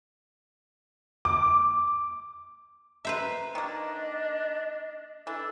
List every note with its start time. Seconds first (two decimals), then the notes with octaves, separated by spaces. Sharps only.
1.25 D6
3.05 B4 C5 E5 A#5
3.55 D#3 A#3 D4 D#5
5.27 E3 D4 A4